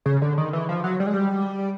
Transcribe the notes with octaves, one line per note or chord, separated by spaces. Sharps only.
C#3
D3
D#3
E3
F3
F#3
G3
G#3
G3